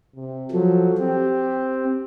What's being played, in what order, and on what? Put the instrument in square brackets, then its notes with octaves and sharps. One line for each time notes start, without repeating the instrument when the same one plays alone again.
[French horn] C3
[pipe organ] F3 F#3 [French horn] A4
[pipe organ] C4 [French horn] G4